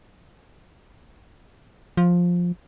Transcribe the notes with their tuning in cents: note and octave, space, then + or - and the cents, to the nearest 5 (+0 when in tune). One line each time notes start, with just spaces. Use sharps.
F3 +10